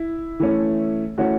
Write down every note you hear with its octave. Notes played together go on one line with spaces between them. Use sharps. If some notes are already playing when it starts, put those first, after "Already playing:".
Already playing: E4
E3 A3 C#4
E3 A3 C#4 F#4